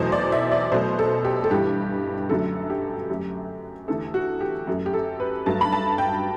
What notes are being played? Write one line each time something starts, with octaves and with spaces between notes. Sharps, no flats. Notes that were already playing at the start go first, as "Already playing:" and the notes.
Already playing: E2 B2 F#3 A3 C5
D5
E5
D5
B2 F#3 A3 C5
A4
G4
A4
G2 E3 G3 G4
F#2 D3 F#3 A3 A4
G4
F#2 F#3 A3
E2 D3 A3 A4
F#4
G4
F#2 F#3 A3
G4
A4
B4
G2 F#3 A3 A5
B5
A5
G5